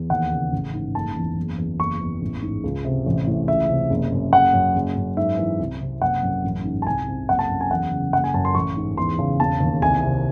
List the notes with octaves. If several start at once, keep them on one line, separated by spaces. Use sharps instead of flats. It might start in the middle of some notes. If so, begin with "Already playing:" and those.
Already playing: E2
D#2 F#5
C#3
A1
G#2
F#1 A5
E2
F#1
E2
F#1 C#6
E2
A1
G#2
C#2
C3
A1
A2
C#2 E5
C3
F#1
F#2
F#1 F#5
F#2
F#1
F#2
G#2 E5
E3
C2
C3
F#1 F#5
F#2
A1
G#2
A5
C2 G#5
C3
F#1 F#5
A5
F#2
G#5
E2 F#5
C#3
F#1 F#5
G#5
F#2 A5
C6
A1 C#6
G#2
E2 C6
C#3
E1 A5
D#2
C2 G#5
C3